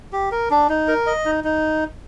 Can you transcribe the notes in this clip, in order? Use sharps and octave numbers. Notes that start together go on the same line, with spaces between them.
G4
A#4
D4
D#4
A#4
D#5
D#4
D#4